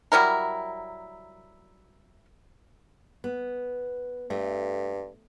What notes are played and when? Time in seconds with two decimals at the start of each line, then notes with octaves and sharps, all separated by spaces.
0.12 F#3 G3 E4 A#4
3.24 B3
4.30 G2 A3